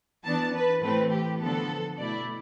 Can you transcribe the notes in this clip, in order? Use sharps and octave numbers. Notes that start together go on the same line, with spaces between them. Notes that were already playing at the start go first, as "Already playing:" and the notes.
E3 B3 D4 A5
B4
A2 E3 A3 C4 B4
G4
D3 F3 B3 A4
B2 A3 E4 D5